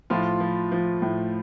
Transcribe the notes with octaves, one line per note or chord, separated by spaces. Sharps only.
A2 F3 F4
F3
F3
A2